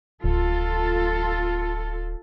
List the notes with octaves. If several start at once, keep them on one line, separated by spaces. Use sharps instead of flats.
D1 F4 A4